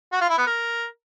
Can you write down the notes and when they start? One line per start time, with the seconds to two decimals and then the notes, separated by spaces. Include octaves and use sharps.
0.12 F#4
0.21 F4
0.30 E4
0.38 B3
0.47 A#4